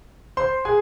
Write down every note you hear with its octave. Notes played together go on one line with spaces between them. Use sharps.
C5 C6
G#4 G#5